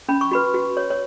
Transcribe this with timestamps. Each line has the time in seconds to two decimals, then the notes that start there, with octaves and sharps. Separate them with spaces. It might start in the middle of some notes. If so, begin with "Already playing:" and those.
0.09 C#4 B5
0.21 C#6
0.31 F#4 B4 B5
0.54 F#4
0.77 C#5
0.90 C#5